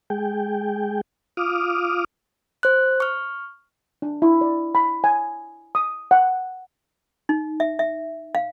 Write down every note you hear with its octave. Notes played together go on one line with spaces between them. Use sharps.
G#3 G#4 G5
F4 D6 D#6 F6
C5 F#6
C#6 F6
D4
E4
D5
B5
G#5
D#6
F#5
D#4
E5
E5
F5